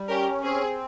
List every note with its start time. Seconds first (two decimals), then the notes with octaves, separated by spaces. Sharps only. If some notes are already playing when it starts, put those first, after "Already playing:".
Already playing: G3
0.08 C#4 G4 A#4
0.43 C4 G#4